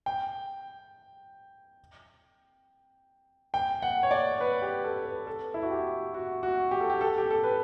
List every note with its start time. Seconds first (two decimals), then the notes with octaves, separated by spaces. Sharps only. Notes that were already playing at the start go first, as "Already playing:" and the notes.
0.06 G5
3.54 G5
3.82 F#5
4.03 C#5
4.11 D5
4.41 B4
4.62 G4
4.84 A4
5.05 B4
5.27 A4
5.54 E4
5.63 F#4
5.71 G4
6.14 F#4
6.43 F#4
6.71 G4
6.80 A4
6.90 G4
7.01 A4
7.18 G4
7.31 A4
7.44 B4